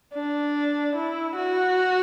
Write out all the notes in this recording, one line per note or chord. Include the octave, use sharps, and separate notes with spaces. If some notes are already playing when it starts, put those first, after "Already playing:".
D4
E4
F#4